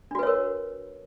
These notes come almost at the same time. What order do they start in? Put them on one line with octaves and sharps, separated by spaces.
D4 F#4 B4 C#5 A#4